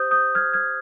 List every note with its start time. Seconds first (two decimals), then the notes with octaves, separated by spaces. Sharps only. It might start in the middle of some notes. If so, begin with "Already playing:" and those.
Already playing: G4 C5 D#6 G6
0.11 D#6 G6
0.35 F6 G#6
0.53 F6 G#6